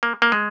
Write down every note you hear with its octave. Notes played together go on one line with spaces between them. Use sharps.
A#3
A#3
G#3